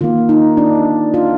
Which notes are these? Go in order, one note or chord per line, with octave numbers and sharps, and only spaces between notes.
D#3 A#3 F4
D#4
D4
F4